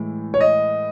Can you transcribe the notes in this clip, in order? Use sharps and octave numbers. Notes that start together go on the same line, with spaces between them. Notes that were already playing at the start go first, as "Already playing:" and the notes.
Already playing: A2 E3 G#3
C#5
D#5